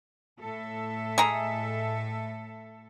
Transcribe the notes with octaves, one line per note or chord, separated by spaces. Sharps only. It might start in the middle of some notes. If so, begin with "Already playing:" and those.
A2 A4 E5
G#3 A#5